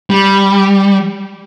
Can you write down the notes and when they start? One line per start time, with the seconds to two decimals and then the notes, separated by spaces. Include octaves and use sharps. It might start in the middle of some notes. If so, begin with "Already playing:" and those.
0.10 G3